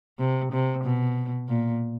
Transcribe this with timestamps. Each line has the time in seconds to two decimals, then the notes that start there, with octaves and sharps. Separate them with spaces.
0.19 C3
0.52 C3
0.84 B2
1.49 A#2